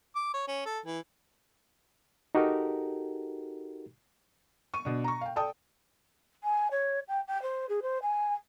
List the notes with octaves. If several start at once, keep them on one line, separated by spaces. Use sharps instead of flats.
D6
C#5
C#4
A4
E3
D#4 F#4 G4 A4 A#4
C#6 D#7
B2 D4
A#5 C#6
F5 G5
A4 D5 G5 A5 D#6
G#5
C#5
G5
G5
C5
G#4
C5
G#5